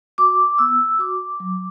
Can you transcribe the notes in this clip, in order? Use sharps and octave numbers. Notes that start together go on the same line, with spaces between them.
F#4 D6
B3 E6
F#4 D6
F#3